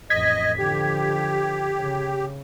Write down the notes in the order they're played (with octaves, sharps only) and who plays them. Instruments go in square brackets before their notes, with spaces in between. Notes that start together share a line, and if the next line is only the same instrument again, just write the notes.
[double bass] A1 F2 [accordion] D#5 [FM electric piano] G#6 B6
[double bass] D3 F3 [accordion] G4
[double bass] C#3